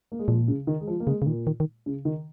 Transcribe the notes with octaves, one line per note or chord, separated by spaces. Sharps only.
A#3
G#3
A#2 F3
C#3
D#3
G#3
F3
A#3
C#3 G#3
C#3
A#2 D#3
D#3
D#3
C#3
D#3